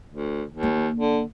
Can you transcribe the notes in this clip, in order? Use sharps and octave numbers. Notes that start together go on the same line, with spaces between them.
D2
D#2
A#3
D3